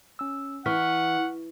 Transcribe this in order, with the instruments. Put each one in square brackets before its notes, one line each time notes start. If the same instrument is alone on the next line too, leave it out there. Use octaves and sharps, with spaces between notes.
[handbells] C#4 E6
[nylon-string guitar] E3 [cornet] F#5 [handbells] C#6 F6 B6